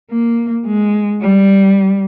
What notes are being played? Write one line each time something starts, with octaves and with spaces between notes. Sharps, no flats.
A#3
G#3
G3